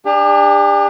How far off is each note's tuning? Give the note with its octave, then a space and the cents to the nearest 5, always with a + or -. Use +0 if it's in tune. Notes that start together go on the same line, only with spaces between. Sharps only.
D4 +10 G4 +45